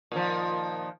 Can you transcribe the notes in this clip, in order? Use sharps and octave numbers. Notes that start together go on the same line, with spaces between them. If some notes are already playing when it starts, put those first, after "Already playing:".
A#2 D#3 F3